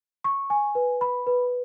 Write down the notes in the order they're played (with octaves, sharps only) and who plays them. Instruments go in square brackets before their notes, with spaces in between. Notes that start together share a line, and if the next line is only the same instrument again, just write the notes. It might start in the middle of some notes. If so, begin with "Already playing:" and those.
[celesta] C#6
G#5
B4
B5
B4